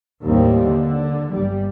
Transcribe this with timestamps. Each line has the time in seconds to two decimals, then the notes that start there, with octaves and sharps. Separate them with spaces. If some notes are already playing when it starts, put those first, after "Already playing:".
0.24 D#2 A2 G3 C4
0.66 D3
1.32 G1 G3